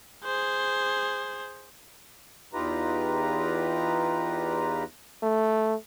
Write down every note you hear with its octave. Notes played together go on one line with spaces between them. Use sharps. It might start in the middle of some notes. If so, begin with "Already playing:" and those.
G#4 C5
E2 D#4 F4 G4 B4 A#5
A3